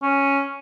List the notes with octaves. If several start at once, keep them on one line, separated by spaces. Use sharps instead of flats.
C#4